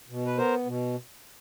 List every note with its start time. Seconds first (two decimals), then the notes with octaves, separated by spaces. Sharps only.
0.09 B2
0.26 B4
0.38 B3 A#4 C5
0.66 B2